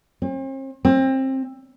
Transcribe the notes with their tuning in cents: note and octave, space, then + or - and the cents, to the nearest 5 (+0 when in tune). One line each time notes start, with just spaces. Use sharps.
C4 +45
C4 +25